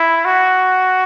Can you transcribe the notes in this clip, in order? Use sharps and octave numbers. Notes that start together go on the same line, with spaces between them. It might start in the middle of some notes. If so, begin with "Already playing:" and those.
Already playing: E4
F#4